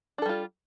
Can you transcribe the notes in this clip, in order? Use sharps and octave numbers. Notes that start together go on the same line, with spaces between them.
G3 D4 F4 A4